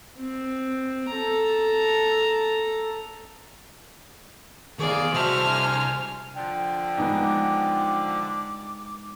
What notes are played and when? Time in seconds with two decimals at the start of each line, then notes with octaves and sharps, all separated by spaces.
0.19 C4
1.10 A4 A#5
4.79 D#3 B3 G#4 D5 F5
5.14 C2 F#4 C5 E5 A5 F6
5.48 D4 G#5
6.35 D3 F3 D4 G5
6.98 G#3 B3 D#4 D6